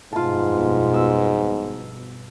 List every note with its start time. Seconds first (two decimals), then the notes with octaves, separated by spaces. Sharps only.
0.13 G1 F2 G#2 B2 F4 A5
0.94 E6